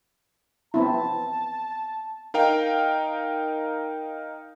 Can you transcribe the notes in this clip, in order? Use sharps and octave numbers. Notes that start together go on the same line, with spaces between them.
B3 C4 E4 A5
D#4 A#4 F5 G5